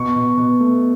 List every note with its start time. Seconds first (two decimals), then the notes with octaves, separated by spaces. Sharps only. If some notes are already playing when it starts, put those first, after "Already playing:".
Already playing: B2 C#6
0.16 B2
0.37 B2
0.60 A3